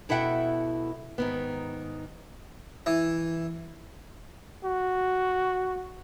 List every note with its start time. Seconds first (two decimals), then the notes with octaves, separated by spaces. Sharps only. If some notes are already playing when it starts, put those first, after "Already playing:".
0.09 B2 E4 A4 E5 F#5 G5
1.18 G#2 D#3 B3
2.86 E3
4.65 F#4